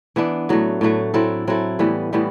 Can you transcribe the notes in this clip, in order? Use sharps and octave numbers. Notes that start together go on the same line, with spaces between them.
E3 B3 D4
A2 F#3 A3
A2 F#3 A3
F#3 C4 E4 A4
F#3 C4 E4 A4
A2 E3 G3 B3
A2 E3 G3 B3